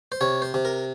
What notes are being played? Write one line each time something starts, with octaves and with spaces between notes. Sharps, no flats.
C5
C3 C#5
C5
C3
A#4